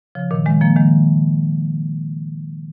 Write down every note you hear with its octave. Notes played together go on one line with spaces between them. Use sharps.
C#3 F3
A#2 D#3
D#3 G#3
F3 A#3
D#3 G#3